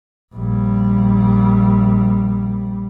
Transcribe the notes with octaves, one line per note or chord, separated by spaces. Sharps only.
A#1 G3